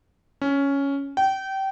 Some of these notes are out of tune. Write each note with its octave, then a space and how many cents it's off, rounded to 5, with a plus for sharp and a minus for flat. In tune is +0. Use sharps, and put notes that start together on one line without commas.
C#4 +5
G5 -25